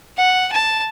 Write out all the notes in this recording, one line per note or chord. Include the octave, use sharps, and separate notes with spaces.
F#5
A5